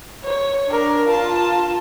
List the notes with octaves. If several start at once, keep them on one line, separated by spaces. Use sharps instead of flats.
C#5
D4 A#4
F4 A5